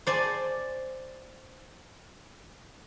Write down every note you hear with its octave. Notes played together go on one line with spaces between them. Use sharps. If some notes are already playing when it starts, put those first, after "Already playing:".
C5 D5 G#5 A5